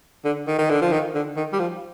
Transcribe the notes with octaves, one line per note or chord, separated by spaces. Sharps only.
D3
D#3
D#3
D3
F3
D#3
D3
D#3
G3
F3